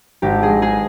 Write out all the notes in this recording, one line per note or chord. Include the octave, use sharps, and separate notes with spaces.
G#1 G4
G#4
G#3
G#4